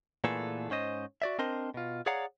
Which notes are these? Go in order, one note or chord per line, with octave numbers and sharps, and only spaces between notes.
A#2 E3 A3 B3 G#4 A4
G#2 C#4 C5 D#5
F#4 D5 E5
C4 D4 A#4 C5 D#5 C6
B2 F4
G#4 C#5 D5 F5 F#5 A#5